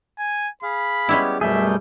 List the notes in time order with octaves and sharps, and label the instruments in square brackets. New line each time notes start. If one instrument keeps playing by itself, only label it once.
[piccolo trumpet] G#5
[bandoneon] G#4 F5 [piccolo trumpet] B5
[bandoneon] G3 B3 G4 [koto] G#3 C#4 E4
[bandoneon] F#2 B2 G6 [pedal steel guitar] G3 A3 G#4 [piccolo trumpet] E5